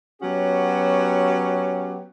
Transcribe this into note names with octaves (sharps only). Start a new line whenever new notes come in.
F#3 B3 C#4 F#4 G4